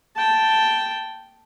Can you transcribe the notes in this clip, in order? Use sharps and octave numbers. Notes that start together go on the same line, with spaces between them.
G5 A5